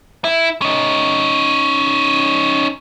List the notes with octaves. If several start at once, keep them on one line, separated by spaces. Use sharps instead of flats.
E4
C#4 D#4